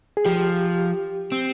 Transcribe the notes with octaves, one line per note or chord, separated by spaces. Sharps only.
G#4
F3 G4
C4